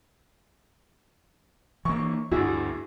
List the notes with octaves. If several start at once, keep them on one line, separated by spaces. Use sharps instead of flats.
E3 A#3 C#6
D2 G2 E4 F#4 G#4